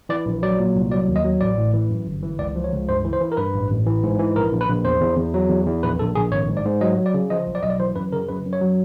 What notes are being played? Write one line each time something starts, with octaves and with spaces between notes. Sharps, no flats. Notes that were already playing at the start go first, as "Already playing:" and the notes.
E3 D5
A#1
F#3 D5
A#2
C2
F#3 D5
D#2
D#5
F#3
A1 D5
A2
E3
F#2
G1
E3
C#2 D5
F3
C#5
C#2
G2 C5
E3
C5
E3
A#4
G2 B4
A1
A1
E3
G#2
E3
A#1 A#4
A#1
B4
A#1
E2 C5
E2
E2
F#3
E2
E2
A#1 B4
A#1 A4
A#1 G#4
G#1 C#5
G#2
D5
G#2
F#3 D#5
F#3
D5
C#3
F3 D#5
B1
D5
B1 D#5
D5
E3 C5
F#2 B4
C#3 A#4
F#2 B4
F#2
C#5
F#3